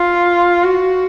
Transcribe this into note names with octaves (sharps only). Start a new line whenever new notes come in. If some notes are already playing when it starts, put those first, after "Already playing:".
Already playing: F4
F#4